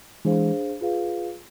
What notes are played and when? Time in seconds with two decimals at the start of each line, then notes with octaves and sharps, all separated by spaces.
0.25 E3 G#3 D4 G#4 C5 F5
0.81 F4 G#4 B4 F5